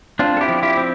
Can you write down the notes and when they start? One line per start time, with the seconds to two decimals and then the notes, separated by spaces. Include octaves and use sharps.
0.19 C4 D4 F4
0.37 A4
0.41 E4 G4
0.49 F3
0.63 E4 G4
0.77 C4